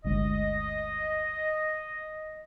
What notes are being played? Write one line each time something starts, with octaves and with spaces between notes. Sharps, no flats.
G1 D2 G#3 D#5